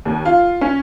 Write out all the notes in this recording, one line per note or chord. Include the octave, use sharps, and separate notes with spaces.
D#2
F4
C#4